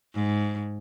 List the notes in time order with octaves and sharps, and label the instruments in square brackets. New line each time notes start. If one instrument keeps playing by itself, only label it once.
[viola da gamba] G#2